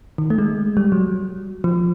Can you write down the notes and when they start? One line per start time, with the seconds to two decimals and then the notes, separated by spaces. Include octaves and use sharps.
0.18 D#3
0.30 A3
0.38 G#3
0.77 G3
0.92 F#3
1.64 F3